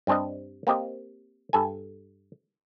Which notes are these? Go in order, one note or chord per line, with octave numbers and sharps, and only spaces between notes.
G2 G3 C4 D4 D#5
A#3 C4 G4 D#5
G2 A4 G#5